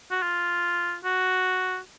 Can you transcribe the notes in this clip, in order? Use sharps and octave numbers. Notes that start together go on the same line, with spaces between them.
F#4
F4
F#4